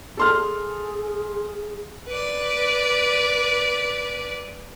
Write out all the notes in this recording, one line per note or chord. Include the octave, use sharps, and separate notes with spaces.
G#4 A4 C6 F6
B4 D5